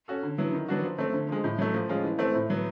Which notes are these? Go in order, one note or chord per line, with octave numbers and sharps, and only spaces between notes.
C#4 F#4 A4
D3
F#3 B3 E4
D#3
F#3 B3 D4 F#4
F3
A3 C4
D3
F3 G#3
A2
F#3 A3
F3
G#3 C#4 F4
E3
A3 C4
A2
F#3 B3